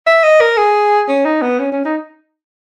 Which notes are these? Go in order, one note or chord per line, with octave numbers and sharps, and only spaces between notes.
E5
D#5
A#4
G#4
C#4
D#4
B3
C#4
C#4
D#4